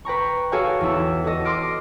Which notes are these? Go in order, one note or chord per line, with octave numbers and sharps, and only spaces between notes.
B4 G5 A#5 C#6
F#4 G#4 A4 C#5 F5 G5
E2 E4 E7
F#4 A4 D#5
C6 D6 D#6 F6 A#6 D7